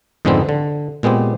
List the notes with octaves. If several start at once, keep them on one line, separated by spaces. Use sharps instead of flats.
F2 G#2 D3 G#3 B3 C4
D3
A#2 G#3 B3 C4 G4